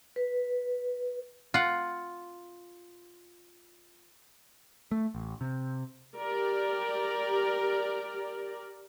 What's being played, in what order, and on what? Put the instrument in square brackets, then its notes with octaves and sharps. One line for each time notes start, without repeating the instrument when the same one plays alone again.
[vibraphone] B4
[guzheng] F4 F#5
[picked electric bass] A3
A1
C3
[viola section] G4 A#4 D5